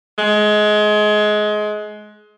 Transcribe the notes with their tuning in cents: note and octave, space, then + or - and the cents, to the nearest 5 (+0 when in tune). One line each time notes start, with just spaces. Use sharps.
G#3 +25